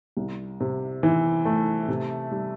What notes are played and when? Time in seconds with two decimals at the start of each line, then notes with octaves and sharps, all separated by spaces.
0.17 C2
0.60 C3
1.03 E3
1.45 A3
1.88 C3
2.31 G3